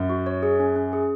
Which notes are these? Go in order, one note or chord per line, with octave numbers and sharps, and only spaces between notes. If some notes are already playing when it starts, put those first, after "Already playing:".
Already playing: F#2
F#4
C#5
G#4
C#4
C#4
G#4